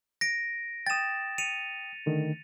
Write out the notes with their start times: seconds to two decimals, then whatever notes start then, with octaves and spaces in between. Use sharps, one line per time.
0.21 A#6 D7
0.86 G5 D#6 A6 E7
1.38 C#7 D#7 F7
2.06 D3 D#3 A3